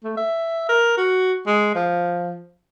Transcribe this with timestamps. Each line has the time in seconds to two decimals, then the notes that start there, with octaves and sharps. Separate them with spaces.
0.04 A3
0.17 E5
0.69 A#4
0.97 F#4
1.47 G#3
1.75 F3